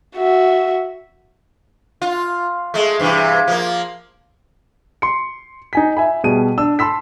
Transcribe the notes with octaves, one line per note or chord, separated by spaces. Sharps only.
F#4 E5
F4
G#3 A3
G2 C3 E3
F3 A#3
C6 C#7
D#4 G#5 B6
E5 G#5 B5
B2 G3 G#4 A5 D#7
D4 E6
A5 B5 C6 E6 B6